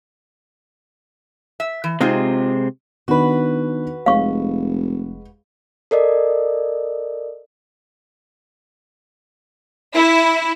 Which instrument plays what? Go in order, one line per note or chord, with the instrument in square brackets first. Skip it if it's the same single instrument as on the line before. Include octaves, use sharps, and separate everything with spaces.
[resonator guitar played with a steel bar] E5
E3
[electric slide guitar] C3 G#3 C4 [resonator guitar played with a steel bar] D#4 F4 G#4
[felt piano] D#3 B3 D4 [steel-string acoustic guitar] F#4 B4
[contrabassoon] F1 [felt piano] G#3 [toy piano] F5 C#6
[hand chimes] A4 A#4 D5 D#5
[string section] E4